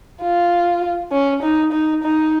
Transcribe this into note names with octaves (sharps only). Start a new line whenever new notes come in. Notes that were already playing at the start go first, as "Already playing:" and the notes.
F4
C#4
D#4
D#4
D#4